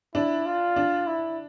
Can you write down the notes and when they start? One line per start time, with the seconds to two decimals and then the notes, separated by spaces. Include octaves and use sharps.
0.15 D4 E4
0.46 F4
0.76 D4
1.07 E4